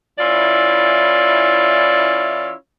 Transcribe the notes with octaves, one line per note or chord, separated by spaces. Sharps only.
E3 C#4 E4 F4 D5